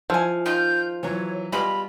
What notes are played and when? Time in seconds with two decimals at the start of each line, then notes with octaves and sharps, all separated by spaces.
0.10 F3 E4 G#5
0.46 D#3 F4 G6
1.03 E3 F#3 C#5
1.52 B2 G3 G#3 F4 B5